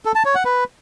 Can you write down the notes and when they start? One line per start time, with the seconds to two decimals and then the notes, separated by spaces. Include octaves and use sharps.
0.05 A4
0.15 A5
0.25 C#5
0.35 F#5
0.45 B4